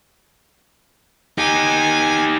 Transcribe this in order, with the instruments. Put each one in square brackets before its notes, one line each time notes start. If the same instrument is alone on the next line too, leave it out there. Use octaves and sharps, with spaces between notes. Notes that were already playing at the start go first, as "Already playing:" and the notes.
[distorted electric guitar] D#4 G4 [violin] G#5